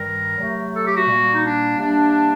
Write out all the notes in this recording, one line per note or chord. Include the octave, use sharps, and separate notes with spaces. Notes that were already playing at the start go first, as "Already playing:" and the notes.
Already playing: G2 D#3 G3 A#4
C3 F#3 A3
A4
G4
F#4
A#2 G3 A#3
D#4
D4
C3 G3 A#3 D4